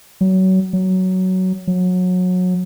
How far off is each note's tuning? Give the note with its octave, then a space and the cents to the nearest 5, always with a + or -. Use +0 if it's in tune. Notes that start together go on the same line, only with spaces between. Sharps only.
F#3 +25
F#3 +10
F#3 -25